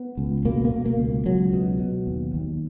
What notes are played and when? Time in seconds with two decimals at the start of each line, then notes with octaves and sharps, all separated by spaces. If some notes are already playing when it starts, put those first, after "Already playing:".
Already playing: B3
0.17 C#2
0.45 B2 A#3
0.65 A#3
0.71 B2
0.86 A#3
0.99 C#2
1.25 C#2 F#3
1.53 B2
1.80 B2
2.07 D#2
2.34 D#2